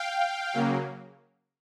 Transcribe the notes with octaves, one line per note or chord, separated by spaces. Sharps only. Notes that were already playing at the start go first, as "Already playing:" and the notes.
Already playing: F5 G5
C#3 F#3 A#3